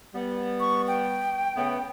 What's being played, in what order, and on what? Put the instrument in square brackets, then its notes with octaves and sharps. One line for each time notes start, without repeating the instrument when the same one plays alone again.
[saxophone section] G3 B3
[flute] C#6
G5
[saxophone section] C#3 A3 B3